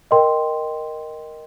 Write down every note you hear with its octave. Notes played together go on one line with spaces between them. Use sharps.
A#4 D#5 G5 C6